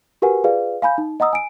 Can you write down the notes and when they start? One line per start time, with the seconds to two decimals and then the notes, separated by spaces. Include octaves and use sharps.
0.22 F#4 G4 A#4 B4 F#5 G#5
0.44 F4 G#4 B4 D5 F5
0.82 F5 G#5 B5 G6
0.98 D#4
1.20 D#5 F#5 A#5 D#6 E6
1.33 G#5 D7